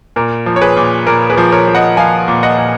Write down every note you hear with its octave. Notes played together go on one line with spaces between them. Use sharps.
A#2 A#4
F3
C#5
G#4 B4
A#2
A#2 A#4
G#4 B4
F3
A#4 C#5
F3
D#5 F#5
F3 F5 G#5
A#2
D#5 F#5
A#2